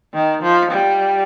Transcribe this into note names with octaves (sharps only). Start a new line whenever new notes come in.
D#3
F3
G3